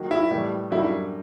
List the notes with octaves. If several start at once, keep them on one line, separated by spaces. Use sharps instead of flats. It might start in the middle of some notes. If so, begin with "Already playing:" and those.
Already playing: D#3 F#3 A#3
E4
A2 E3 G3
F#2 D3 G3 E4